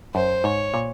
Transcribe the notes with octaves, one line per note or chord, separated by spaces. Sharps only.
F#2 C5
G#2 C#5
A#2